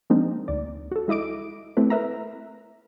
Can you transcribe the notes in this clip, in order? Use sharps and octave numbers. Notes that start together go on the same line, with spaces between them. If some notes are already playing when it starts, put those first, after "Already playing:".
F3 G#3 A#3 C4 D4 D#4
D2 D5
F#4 A4
G#3 E4 D#5 D6 D7
A3 C4 E4 A4 B4
A#4 B4 E5 A#5